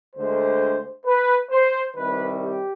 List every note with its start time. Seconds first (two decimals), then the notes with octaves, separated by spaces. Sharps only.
0.15 D2 D3 G#3 C5
1.06 B4
1.50 C5
1.95 C2 C3 D#3 G3 B4
2.40 G4